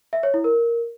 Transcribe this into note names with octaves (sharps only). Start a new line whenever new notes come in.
E5
C#5
E4
A#4